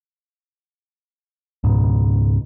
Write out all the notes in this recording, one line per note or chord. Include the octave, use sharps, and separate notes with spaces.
C#2 G#2 B2